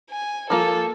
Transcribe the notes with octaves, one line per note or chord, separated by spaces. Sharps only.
G#5
F3 A#3 F4 A4